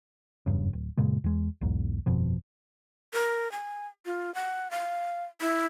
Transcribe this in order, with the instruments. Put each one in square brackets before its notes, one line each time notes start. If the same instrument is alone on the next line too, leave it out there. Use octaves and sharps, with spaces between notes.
[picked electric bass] F#1 E2 G2 C#3
D1
F#2 A#2 C#3 G#3
E2 G#3
B1 E2 G#2
G1 F2 B2 F3
[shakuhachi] A#4
G#5
F4
F#5
F5
E4